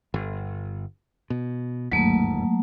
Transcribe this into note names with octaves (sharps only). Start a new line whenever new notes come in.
G1
B2
G1 D#2 G#2 F#3 A3 A#3